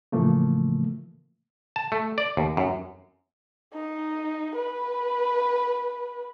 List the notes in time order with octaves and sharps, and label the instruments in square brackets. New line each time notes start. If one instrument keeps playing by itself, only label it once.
[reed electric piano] A2 C#3 E3 F3 A3 A#3
[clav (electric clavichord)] A5
A3
D5
D#2
F#2
[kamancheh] D#4
B4